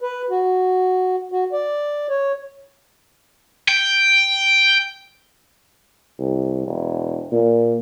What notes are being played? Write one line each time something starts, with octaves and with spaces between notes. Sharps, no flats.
B4
F#4
F#4
D5
C#5
G5
C2
E1
A#2